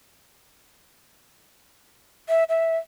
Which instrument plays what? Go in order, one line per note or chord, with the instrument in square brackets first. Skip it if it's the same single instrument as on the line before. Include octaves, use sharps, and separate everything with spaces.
[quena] E5
E5